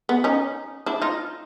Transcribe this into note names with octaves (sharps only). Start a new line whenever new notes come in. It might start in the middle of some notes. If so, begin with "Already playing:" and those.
B3
C#4 D#4
D4 E4
D#4 F4